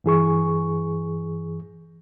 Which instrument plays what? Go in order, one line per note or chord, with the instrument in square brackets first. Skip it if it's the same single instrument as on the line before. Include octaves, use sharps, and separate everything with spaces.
[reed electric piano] G2 E3 G#4 C#6